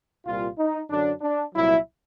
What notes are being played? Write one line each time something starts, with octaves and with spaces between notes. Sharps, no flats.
C2 A#2 G3 F4
D#4
F#2 D3 F#3 D4
D4
C2 A#2 F#3 E4